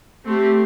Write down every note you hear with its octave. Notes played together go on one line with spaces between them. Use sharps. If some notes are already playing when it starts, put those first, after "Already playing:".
A3 C4 G4